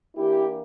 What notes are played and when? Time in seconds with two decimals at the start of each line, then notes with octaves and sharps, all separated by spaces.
0.16 E3 A#3 D4 E4 G4